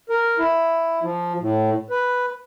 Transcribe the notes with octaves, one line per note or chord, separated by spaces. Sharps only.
A#4
E4
F3
A2
B4